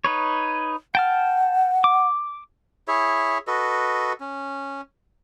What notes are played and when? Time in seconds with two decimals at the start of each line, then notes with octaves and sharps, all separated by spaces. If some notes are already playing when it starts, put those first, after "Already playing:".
0.04 D#4 B4 C#5
0.95 F#5 G5 A5 F6
1.84 D6
2.88 E4 G#4 C#5 E5
3.47 F#4 A4 B4 D#5
4.20 C#4